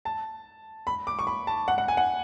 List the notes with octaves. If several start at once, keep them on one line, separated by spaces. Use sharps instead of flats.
A5
B5
D6
C#6
B5
A5
F#5
F#5
G#5
F#5